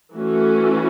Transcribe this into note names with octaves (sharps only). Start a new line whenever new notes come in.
E3 A3 C#4 F#4